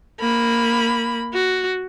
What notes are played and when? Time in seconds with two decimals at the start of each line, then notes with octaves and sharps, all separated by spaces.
0.21 A#3 B5
1.33 F#4